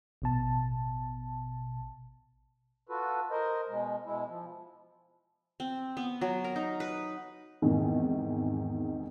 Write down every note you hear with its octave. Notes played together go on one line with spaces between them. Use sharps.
A1 B2 A5
F4 F#4 A4 B4
A#4 C5 D#5
B2 G#3
B2 G#3 E4
F3
C4
B3
F#3
A#4
D#4
B4
E2 G#2 C3 D#3